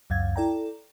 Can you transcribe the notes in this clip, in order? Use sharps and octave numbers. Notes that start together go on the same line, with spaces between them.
C#2 F#2 F5 G#6
E4 A4 D5 G5 A#5